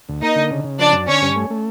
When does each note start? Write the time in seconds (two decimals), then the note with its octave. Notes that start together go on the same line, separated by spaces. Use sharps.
0.09 D2
0.22 A#3 D#4 D#5
0.36 D3
0.51 C#3
0.64 C#3
0.79 F3 D4 D5
0.93 F#2
1.08 D3 C#4 C#5
1.22 G2
1.36 A3
1.50 A3